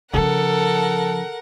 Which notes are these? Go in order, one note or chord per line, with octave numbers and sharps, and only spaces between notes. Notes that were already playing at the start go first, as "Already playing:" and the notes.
C#3 F3 A4 A#4 F#5